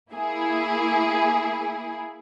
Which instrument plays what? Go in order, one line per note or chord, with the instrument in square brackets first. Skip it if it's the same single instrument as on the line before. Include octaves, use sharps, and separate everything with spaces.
[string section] A#3 E4 G#4